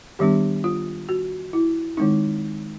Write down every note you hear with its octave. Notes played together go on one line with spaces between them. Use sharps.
D#3 G3 B3 D4 G4
F4
F#4
E4
D#3 G#3 C4 D#4